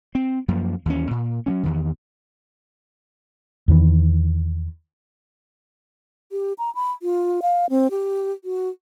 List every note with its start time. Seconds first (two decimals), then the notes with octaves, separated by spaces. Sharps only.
0.15 C4
0.48 F#2 F3 A#3
0.86 D#2 E3 C#4
1.11 A#2
1.46 F#3 G3 C#4
1.63 E2 D#3
3.68 E2 D#3 E3
6.32 G4
6.59 A#5
6.75 B5
7.02 F4
7.42 F5
7.70 C4
7.91 G4
8.44 F#4